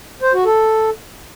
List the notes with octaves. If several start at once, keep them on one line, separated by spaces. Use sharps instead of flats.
C5
F#4
A4